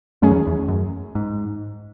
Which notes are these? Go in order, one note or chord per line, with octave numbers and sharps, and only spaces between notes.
F#2 D#3 F#3 A3 C#4 G#4
E2
E2
F#2
G#2